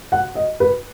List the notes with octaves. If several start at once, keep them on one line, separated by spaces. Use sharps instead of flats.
F#5
D#5
B4